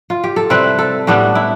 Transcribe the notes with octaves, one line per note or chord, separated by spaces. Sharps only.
F4
G4
A4
C3 G3 C4 E4 B4
A4
A2 G3 B3 D4 G4
E4